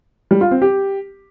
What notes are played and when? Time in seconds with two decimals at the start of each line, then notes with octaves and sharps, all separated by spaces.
0.31 G3
0.41 F4
0.51 C4
0.62 G4